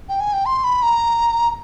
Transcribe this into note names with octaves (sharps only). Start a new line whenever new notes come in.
G5
G#5
G5
C6
B5
A#5